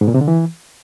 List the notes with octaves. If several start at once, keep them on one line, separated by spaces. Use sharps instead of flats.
G#2
A#2
C3
D3
E3